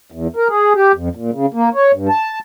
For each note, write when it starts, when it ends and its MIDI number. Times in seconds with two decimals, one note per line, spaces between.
0.12 0.27 40
0.36 0.48 70
0.48 0.73 68
0.75 0.92 67
0.95 1.09 41
1.15 1.31 46
1.32 1.46 49
1.54 1.69 58
1.75 1.92 73
1.94 2.08 43
2.09 2.39 81